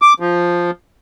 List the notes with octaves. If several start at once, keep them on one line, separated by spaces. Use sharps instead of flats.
D6
F3